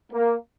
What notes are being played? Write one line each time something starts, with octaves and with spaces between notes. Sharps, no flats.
A#3